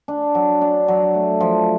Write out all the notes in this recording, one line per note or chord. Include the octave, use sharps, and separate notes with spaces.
D4
F#3
D4
F#3
A3
F3